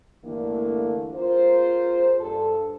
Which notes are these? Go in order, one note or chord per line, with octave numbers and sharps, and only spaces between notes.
G2 D3 E3 A3 A#3
A#3 F4 G#4 C5
G2 A4